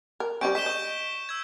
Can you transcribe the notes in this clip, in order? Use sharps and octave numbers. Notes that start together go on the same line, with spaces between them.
A#4
G3 C4 C#4 C#6 G6 D7
G#3 B6 E7 G7
D#5 C#6 G6
E6 G#6